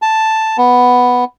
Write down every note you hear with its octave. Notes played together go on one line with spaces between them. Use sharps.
A5
B3